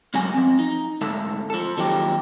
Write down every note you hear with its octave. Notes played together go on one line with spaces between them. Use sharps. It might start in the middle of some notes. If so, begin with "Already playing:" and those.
D2 G#2 F#3 F#4 G#5
F3 C4
D#4
D2 G#2 A4 E5
F3 A4
D#2 F3 F#3 D#4 G4